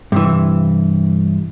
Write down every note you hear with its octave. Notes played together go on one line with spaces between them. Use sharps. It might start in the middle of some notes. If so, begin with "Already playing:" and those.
G2 C3 E3